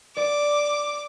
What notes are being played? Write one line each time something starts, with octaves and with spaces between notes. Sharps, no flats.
D5 D6